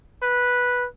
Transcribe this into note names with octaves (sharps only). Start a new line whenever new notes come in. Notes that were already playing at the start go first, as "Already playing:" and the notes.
B4